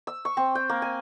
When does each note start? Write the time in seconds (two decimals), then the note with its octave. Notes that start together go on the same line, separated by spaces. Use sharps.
0.07 E6
0.25 C#6
0.37 C4
0.55 G5
0.69 A#3
0.82 G#5